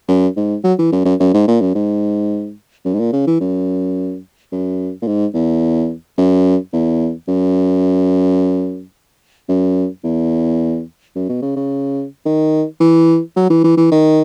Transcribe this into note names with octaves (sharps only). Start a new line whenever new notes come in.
F#2
G#2
F#3
E3
F#2
F#2
F#2
G#2
A#2
F#2
G#2
F#2
G#2
A#2
C#3
E3
F#2
F#2
A#2
G#2
E2
F#2
E2
F#2
F#2
E2
F#2
B2
C#3
C#3
D#3
E3
F#3
E3
E3
E3
D#3